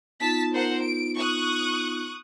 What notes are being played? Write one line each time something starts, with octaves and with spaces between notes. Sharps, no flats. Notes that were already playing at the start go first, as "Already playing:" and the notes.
B3 D#4 F4 A5 B6
A#4 C5 F#5
D7
C#6 D#6 F#6